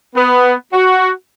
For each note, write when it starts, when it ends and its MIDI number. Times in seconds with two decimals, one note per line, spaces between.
0.15 0.53 59
0.72 1.10 66